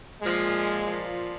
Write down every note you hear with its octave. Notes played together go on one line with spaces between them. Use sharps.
A#2 F3 G#3
F3
A#2